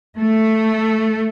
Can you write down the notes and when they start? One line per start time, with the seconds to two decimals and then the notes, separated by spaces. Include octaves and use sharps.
0.20 A3